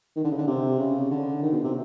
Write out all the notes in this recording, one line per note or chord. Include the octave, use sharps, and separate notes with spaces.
D#3
D3
C#3
D3
C3
C#3
D3
D#3
B2
C3